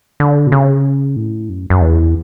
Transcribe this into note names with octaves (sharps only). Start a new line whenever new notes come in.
D3
B2
C#3
A2
F#2
F#2
E2